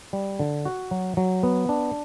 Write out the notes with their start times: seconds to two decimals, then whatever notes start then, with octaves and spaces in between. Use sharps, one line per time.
0.13 G3
0.40 D3
0.66 F#4
0.91 F#3
1.17 F#3
1.43 B3
1.69 D4